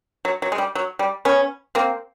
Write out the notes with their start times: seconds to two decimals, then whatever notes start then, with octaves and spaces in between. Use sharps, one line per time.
0.25 F#3
0.42 F#3
0.52 G#3
0.58 G3
0.75 F#3
0.99 G3
1.25 B3 C#4
1.75 A#3 C4